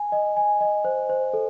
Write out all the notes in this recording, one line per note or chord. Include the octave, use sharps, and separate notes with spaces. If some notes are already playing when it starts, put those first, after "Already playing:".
Already playing: G#5
D#5
G#5
D#5
C5
C5
A4